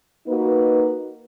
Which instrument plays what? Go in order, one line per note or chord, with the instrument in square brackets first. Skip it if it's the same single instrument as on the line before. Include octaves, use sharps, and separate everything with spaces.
[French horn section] A#3 D#4 F#4 B4